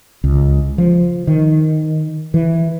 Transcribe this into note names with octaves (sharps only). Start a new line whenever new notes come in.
C#2
F3
D#3
E3